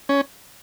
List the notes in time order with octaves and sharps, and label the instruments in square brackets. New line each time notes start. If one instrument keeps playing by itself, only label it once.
[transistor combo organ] C#4